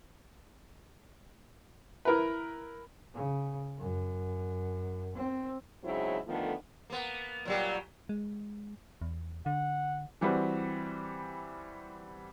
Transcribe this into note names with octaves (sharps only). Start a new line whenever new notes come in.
E4 A#4 B4
C#3
F#2
C4
G#2 C#3 F#3 C4 E4
D3 D#3 F3 A3 B3
A#3 B3
A#2 F#3 G3
G#3
E2
D3 F#5
E3 G3 C4 F#4 B4